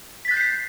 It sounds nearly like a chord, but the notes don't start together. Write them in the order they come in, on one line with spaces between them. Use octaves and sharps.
B6 A6 F#6 G6 C7